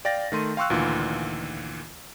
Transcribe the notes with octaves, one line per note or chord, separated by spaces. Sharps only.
D5 F5 G5 A6 A#6
D#3 A3 C6 D#7
F5 G5 C6 C#6 E6 F#6
D2 A#2 D#3 E3 F4